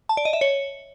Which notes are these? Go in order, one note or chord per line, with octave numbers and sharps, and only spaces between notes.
A5
D5
D#5
E5
C#5